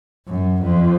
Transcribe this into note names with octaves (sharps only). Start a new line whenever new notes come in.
F#2
F2